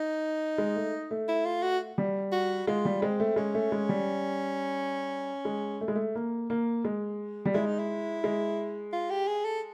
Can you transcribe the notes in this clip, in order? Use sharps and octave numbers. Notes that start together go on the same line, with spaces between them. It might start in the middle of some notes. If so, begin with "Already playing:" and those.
Already playing: D#4
G#3
A3
A3
E4
F4
F#4
G3
F#4
G#3 F4
G3
G#3 C4
A3
G#3 C#4
A3
G#3
G3
G#3
A3
G#3
A3
A#3
A#3
G#3
G3
G#3 E4
D#4
E4
G#3
F4
G4
G#4
A4